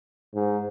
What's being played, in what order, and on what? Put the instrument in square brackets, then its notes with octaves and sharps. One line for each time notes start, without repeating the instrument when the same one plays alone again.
[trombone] G#2